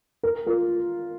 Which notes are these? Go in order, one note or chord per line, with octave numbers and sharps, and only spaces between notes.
A#4
F4 A#4